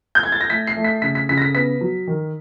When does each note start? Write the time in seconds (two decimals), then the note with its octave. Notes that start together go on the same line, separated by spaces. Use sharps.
0.15 G6
0.23 G#6
0.32 A6
0.41 A#6
0.49 A3 B6
0.67 C7
0.77 A3
0.84 B6
1.02 C#3 B6
1.15 B6
1.29 C#3 B6
1.37 A#6
1.42 B6
1.55 B3 B6
1.81 F#3
2.07 D#3